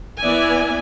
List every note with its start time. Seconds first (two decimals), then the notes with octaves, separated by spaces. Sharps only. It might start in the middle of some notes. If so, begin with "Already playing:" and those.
0.20 E3 B3 D5 E5 G#5